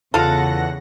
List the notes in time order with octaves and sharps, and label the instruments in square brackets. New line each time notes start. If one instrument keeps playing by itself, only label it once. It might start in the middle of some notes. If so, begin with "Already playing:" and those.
[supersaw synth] E2 F#5 A#6 [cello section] C#3 [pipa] F4 A4